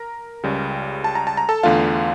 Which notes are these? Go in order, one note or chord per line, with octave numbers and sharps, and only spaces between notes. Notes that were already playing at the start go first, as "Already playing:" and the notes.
Already playing: A#4 A#5
C#2 C#3 G3
A5
A#5
A5
A#5
A4 A5
E2 D3 A3 F4 F5